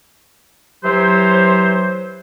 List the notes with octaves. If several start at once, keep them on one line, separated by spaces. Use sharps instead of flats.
E3 F#3 G4 C5